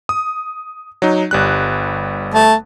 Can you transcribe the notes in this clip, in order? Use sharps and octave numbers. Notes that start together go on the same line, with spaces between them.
D#6
F#3 D#4
G1 G3 F#6
A3 A5